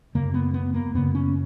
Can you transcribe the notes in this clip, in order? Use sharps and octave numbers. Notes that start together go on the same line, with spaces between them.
F#2 C#3 A#3
B3
B3
A#3
F#2 C#3 B3
C#4